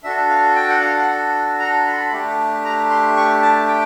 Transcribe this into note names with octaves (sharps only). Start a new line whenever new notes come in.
D4 F#4 A4 E5
F5
G5
F#5
F5
F#5
A#5
B5
C6
B5
A3 D4 G4
A#5
C6
C#6
A5
G5